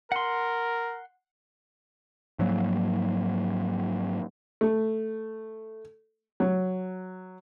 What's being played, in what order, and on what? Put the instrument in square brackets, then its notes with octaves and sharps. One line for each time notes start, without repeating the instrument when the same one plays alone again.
[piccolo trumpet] A#4 [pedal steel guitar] F#5 C6
[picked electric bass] G#2 F3 F#3 A#3
[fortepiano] A3
F#3